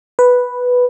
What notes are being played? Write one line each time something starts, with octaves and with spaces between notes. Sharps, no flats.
B4